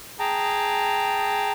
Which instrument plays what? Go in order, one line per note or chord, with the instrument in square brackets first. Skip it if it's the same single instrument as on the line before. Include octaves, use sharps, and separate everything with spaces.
[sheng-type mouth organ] G#4 G5 A5 A#5